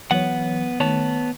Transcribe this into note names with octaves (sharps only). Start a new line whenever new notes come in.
E3 F#3 B3 C#5 F#5
D#3 A3 B3 C#5 A5